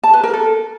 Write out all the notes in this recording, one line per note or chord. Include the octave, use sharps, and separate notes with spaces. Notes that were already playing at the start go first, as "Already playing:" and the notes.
A5
B4
A#4
A4